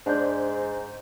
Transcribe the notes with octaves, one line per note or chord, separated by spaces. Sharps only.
G#2 D4 C5 G6